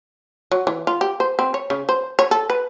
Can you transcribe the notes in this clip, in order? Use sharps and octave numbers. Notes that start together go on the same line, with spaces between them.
F#3
E3
F4
G4
C5
C4
C#5
C#3
C5
C#5
A4
B4